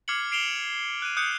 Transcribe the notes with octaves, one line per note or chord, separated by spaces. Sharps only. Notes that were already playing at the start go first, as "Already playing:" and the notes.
D6 F6 G#6 C7 C#7 F#7
C7 D7 E7 F7 G7
F#7
F#6 D#7
D#6 F#6 G6 C#7